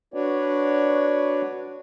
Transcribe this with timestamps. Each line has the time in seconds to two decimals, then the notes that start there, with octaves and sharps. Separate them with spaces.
0.14 D4 F#4 B4 C#5 D5